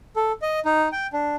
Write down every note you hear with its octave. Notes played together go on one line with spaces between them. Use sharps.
A4
D#5
D#4
G5
D4